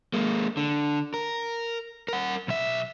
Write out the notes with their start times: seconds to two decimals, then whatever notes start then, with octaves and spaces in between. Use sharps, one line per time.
0.14 G#3 A#3
0.57 D3
1.14 A#4
2.08 A#4 F#5
2.48 B1 E5